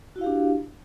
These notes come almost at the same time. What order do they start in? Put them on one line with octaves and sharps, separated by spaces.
F#4 E4 F5 G4 D4